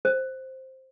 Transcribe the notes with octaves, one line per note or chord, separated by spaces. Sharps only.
C5